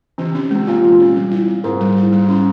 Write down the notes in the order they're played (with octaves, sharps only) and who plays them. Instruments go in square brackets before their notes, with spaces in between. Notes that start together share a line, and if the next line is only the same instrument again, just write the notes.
[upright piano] C3 [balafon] E3
[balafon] C#4
[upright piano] C3 [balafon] G#3
[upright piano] A#2 [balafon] F4
[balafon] E3
C#4
G3
E4
C4
[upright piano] G#2 [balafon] A#4
[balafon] G3
E4
G3
C#4